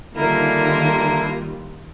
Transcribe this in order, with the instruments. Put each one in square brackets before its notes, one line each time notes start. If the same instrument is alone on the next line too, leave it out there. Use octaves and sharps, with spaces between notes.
[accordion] D3 E4 A#4 [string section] D#3 G3 F4 [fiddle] A#3